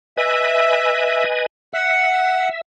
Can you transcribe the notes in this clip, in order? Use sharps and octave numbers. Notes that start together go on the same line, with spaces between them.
B4 D#5 E5 G#5
E5 F#5